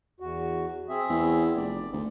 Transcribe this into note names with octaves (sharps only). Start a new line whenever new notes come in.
E2 F#4
C4 G#4 E5
E2
F1 D5
D2